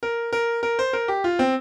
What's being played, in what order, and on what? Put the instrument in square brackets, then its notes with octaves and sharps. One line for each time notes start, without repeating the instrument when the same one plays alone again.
[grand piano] A#4
A#4
A#4
C5
A#4
G4
F4
C4